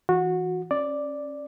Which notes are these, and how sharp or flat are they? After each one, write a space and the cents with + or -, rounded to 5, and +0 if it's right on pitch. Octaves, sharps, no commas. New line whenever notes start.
E3 +0 F#4 -20
C#4 -25 D5 +0